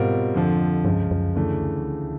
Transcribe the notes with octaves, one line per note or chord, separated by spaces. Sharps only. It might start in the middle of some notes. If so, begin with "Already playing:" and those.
Already playing: G#2 B2 G3 C4 F4 A#4
F2 D3 F3
C#2 G2 C#3 F3
F#2
D2 C#3 E3 A3 D4